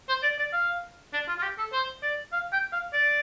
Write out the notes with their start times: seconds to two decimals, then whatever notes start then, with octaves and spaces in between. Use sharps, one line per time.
0.09 C5
0.23 D5
0.39 D5
0.53 F5
1.13 D4
1.28 F4
1.38 F4
1.43 G4
1.58 A4
1.73 C5
2.03 D5
2.33 F5
2.53 G5
2.72 F5
2.93 D5